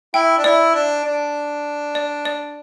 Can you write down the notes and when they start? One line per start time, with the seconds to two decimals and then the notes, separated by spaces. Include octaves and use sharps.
0.14 E4 G5
0.38 D4
0.44 E4 D5
0.74 D4
1.04 D4
1.95 D5
2.25 D5